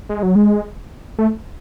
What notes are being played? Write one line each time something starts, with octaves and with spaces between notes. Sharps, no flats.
G#3
F#3
G#3
A3